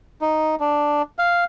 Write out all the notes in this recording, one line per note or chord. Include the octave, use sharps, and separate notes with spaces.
D#4
D4
F5